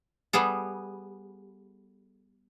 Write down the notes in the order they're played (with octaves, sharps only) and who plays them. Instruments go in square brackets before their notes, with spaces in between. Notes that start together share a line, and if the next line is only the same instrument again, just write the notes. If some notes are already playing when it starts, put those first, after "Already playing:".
[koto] G3 B3 G#4 A4